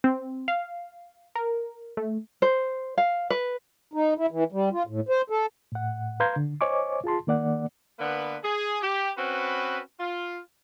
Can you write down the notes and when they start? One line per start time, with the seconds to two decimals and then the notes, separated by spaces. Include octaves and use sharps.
0.04 C4
0.48 F5
1.36 A#4
1.97 A3
2.42 C5
2.98 F5
3.30 B4
3.93 D#4
4.18 E4
4.31 E3
4.52 G3
4.73 F4
4.87 A2
5.09 C5
5.30 A4
5.72 A2 F#5
6.20 B4 F5 A#5 C6 G6 G#6
6.36 D3
6.61 C5 C#5 D#5 G#5 C#6 D6
7.04 F4 G#4 A5 C6
7.27 D#3 A#3 D5 F#5
7.99 D3 A#3 B3 B4
8.44 G#4
8.82 G4
9.17 C4 C#4 F#4 B4
10.00 F4